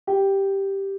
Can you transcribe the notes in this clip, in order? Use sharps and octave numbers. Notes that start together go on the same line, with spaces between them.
G4